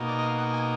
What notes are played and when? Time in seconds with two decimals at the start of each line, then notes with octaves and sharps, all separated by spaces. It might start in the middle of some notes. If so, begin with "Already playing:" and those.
Already playing: B2 A#3 D#4
0.08 D5
0.19 D#5
0.23 F5
0.38 F#5
0.53 G#5